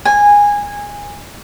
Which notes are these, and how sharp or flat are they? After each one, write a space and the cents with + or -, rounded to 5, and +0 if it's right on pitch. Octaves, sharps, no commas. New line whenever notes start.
G#5 -15